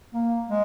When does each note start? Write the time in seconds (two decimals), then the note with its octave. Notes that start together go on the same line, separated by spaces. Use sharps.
0.14 A#3
0.49 G#3